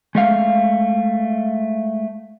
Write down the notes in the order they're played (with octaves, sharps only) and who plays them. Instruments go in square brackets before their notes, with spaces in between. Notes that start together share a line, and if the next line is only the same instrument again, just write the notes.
[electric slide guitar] G#3 A3 F5